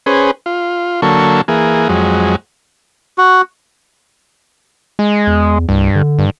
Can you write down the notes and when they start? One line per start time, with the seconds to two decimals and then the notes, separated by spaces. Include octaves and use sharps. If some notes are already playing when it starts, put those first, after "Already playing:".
0.06 C#4 G#4 B4 C5
0.46 F4
1.02 D3 F#3 A#3 A4 C#6
1.48 E3 A#3 G#4
1.89 F2 F#3 G#3
3.18 F#4
4.99 G#3
5.27 E2
5.69 C2 G2
5.95 D3
6.19 G2